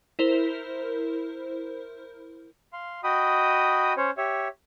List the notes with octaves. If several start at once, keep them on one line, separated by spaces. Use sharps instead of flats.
E4 A#4 C5
F5 C6
F#4 D#5 G5 B5 D#6
C#4 C5 C#5
G4 C#5 E5